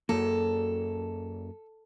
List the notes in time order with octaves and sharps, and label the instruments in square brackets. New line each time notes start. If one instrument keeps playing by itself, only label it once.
[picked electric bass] F#2 A#3 [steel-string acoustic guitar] A4